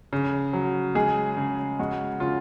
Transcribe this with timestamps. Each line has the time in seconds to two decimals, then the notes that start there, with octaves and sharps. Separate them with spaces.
0.13 C#3
0.53 F#3
0.95 G#3 G#4
1.37 C#3
1.79 G#3 F#4
2.20 C#3 F4